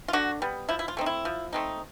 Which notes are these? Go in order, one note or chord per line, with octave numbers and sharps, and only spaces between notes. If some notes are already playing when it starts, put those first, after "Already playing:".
F4
D3 F#4
G3 B3
F3 E4
E4
F4
A3 C4 D#4
E4
F3
A3 C4 D#4